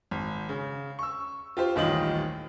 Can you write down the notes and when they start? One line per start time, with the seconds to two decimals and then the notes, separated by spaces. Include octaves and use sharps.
0.11 G#1
0.49 C#3
0.99 C#6 E6
1.57 F4 G4 C5
1.76 D#1 A1 D#3 F4 D#5 F#7